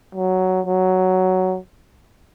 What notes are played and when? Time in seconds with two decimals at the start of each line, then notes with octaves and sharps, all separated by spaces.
0.15 F#3
0.67 F#3